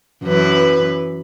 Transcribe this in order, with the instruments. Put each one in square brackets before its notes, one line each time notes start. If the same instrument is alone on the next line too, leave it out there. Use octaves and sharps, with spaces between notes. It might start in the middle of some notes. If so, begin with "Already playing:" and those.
[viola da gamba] F#2 E3 B4